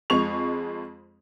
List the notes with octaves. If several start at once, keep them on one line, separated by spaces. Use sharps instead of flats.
F2 G#3 C#6 F7